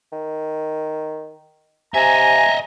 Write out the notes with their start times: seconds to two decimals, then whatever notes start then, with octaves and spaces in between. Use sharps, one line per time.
0.12 D#3
1.94 C3 D#5 E5 G#5 A#5